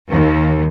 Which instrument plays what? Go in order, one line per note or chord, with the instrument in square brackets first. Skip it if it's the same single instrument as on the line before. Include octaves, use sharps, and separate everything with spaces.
[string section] D#2